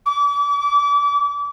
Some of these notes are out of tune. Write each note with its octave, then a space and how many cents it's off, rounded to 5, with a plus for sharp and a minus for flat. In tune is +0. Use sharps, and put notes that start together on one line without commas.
D6 -35